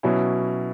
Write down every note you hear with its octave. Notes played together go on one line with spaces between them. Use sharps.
B2 F#3 C#4 E4